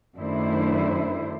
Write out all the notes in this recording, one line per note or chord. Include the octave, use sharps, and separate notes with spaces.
F#2 D#3 A3 D4 E4 C5